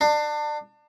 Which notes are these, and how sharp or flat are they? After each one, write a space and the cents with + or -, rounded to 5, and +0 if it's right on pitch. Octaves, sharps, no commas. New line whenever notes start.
D4 +30